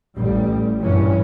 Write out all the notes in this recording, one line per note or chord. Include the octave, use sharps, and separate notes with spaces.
A1 G3
G2 A#2 E3 C#4